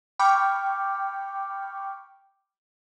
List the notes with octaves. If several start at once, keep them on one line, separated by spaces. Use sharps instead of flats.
G5 B5 C#6 D6 F6 G6